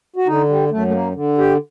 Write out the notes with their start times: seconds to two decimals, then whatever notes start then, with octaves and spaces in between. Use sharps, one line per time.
0.16 F#4
0.27 D3 D#4
0.49 G3
0.71 F#2 A3
0.87 A3
0.93 A#3
1.15 D3
1.38 G4